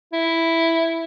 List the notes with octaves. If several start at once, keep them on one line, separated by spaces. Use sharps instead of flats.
E4